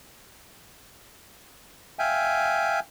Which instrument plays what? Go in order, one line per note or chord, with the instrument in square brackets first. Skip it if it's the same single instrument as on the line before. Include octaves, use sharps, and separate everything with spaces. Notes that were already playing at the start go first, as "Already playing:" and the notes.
[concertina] E5 F5 G5 G#5